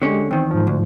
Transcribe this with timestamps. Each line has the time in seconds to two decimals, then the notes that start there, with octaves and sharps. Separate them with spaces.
0.02 D3 G#3 C#4 G4
0.31 E2 D#3 C4
0.51 G#2 F3
0.67 D2